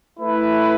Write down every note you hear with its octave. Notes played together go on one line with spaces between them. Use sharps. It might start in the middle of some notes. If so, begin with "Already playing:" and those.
A3 E4 B4